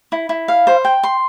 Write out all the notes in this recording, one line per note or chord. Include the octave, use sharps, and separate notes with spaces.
E4
E4
F5
C5
G5
C6